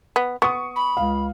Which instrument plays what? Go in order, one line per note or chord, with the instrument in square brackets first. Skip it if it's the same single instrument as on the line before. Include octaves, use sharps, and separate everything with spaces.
[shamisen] B3
[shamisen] B3 [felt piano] C#6 D#6
[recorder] B5
[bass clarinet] C#2 [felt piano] F5